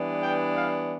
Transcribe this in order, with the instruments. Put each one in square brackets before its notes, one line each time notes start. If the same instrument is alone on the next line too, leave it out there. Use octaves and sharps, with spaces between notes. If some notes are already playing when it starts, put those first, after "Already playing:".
Already playing: [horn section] E3 G3 B3 D4
G5
F5